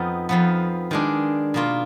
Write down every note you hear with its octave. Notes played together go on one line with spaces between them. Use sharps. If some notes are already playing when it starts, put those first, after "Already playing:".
Already playing: F2 F3 B3 D#4
F2 F3 B3
D#3 G#3 D4
B2 A#3 F4